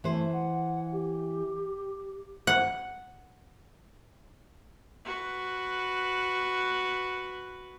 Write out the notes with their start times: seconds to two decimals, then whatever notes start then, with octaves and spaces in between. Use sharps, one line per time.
0.04 E3 A3 C5
0.32 F#5
0.92 G4
2.47 F#5
5.05 F#4 B4